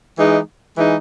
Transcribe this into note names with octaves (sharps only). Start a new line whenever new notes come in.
E3 G#3 D#4
E3 G#3 D#4